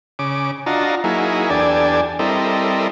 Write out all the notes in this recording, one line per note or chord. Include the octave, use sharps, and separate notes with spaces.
C#3 D6
D4 F4 F#4 D#5 A5 A#5
F#3 A#3 D#4 E4 G#4
E2 D4 G4 A4 D5 G#5
G3 C4 E4 A4 A#4 D#5